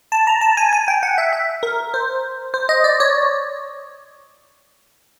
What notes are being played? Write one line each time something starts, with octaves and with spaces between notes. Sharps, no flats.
A5
A#5
A5
G#5
G#5
G5
F#5
E5
E5
A#4
C5
C5
D#5
D5
C#5